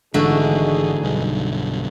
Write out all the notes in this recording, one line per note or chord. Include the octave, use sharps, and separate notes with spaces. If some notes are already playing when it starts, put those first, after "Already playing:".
G#1 G#2 D3 E3 A3 D#4 F#4 G#4
B1 G2